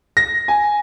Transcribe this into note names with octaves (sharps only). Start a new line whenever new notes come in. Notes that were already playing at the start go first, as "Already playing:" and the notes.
A#6
G#5